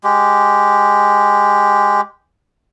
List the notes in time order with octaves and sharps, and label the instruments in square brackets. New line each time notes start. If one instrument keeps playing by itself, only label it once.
[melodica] G#3 G4